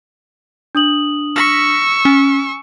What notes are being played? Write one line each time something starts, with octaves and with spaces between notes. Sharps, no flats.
D4 D#6 F#7
C#6 E6 F6 A#6 B6
C#4 G#5